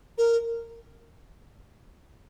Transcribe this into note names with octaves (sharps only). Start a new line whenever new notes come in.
A#4